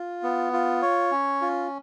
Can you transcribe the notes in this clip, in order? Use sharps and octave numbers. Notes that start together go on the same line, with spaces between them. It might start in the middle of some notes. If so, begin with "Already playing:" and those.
Already playing: F4
B3
F4
C#5
C#4
F4